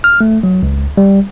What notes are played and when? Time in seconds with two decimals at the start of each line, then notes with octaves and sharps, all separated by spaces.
0.04 F6
0.21 A3
0.43 F#3
0.63 C#2
0.97 G3